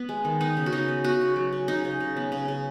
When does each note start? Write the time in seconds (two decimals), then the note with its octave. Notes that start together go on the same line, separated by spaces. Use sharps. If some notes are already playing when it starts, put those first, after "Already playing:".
Already playing: B3
0.09 G#3
0.25 D#3
0.41 B3 D#4
0.57 C#3
0.66 F#4
0.73 C#3 D#4
0.88 B3
1.04 B3 F#4
1.21 C#3
1.36 F#3
1.53 C#3
1.68 C#3 D#4
1.85 C#3
2.00 C#3
2.17 B3
2.32 C#3
2.48 C#3